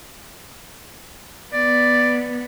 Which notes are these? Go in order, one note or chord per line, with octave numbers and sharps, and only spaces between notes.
B3 D5